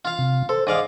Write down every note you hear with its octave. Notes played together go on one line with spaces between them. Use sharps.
F4 F5
C3
A4 C5
G#2 D5 F5 D#6